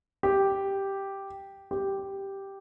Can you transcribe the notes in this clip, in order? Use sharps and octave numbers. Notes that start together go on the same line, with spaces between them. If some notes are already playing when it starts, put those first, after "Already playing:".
G4
G4